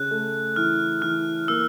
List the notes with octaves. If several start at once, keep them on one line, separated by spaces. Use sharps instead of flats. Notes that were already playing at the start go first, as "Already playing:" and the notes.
Already playing: C#3 F#6
A3
E3 F6
E3 F6
A#3 E6